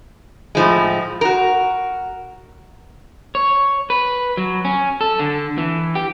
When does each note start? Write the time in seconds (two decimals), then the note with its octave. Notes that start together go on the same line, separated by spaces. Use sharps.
0.55 A2 F3 G#3
1.21 F#4 A#4
3.35 C#5
3.90 B4
4.37 F#3
4.65 C#4
5.01 A4
5.19 D3
5.58 E3
5.95 G4